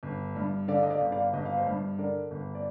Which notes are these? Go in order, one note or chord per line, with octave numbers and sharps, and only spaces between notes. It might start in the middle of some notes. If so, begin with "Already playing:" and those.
G1
G2
D3 D5 F5
D#5
D5 F5
G1
D5 F5
G1 D#5
F5
C5 D#5
G2
D3 A#4 D5
G1
D5